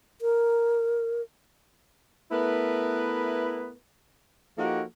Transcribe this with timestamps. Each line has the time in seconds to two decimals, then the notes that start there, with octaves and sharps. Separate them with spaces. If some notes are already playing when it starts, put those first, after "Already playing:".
0.21 A#4
2.32 A3 B3 E4 A#4 B4
4.58 F3 A#3 D#4 F#4 G4 A4